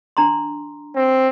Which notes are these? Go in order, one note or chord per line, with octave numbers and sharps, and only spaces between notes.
D4 A#5 C6
C4